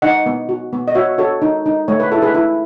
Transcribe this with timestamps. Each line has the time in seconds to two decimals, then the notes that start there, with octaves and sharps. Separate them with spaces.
0.02 D#4 D#5 F#5
0.26 B3
0.49 F#4
0.73 B3
0.88 D#5
0.95 F#4 C#5 E5
1.18 F#4 A4 C#5
1.42 D#4
1.66 D#4
1.88 A3 C#5
2.00 B4
2.11 E4 A4
2.22 G#4 B4
2.34 E4